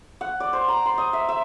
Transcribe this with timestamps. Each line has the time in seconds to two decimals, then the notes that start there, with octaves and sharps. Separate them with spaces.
0.21 F#5
0.40 D5
0.53 C5
0.68 A#5
0.86 C6
0.98 D#5
1.13 E5
1.29 E5